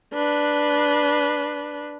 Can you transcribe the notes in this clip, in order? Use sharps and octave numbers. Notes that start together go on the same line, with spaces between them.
D4 B4